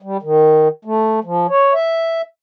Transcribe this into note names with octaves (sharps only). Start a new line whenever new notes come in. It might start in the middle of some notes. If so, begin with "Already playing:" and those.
G3
D#3
A3
F3
C#5
E5